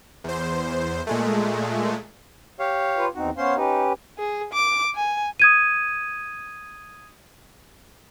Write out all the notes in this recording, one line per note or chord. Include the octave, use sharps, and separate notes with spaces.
E2 C5
A#2 G#3 A3
G4 C#5 F5
F4 B4
E2 C4 D#4 F#4
B3 C#4 C5 C#5 F5 C6
C#4 D#4 G4 B4
G#4
D6
G#5
D#6 G#6 D#7